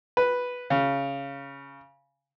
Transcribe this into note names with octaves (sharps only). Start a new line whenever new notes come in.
B4
C#3